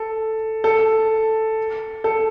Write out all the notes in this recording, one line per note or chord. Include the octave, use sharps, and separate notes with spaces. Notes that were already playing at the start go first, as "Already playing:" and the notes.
Already playing: A4
A4
A4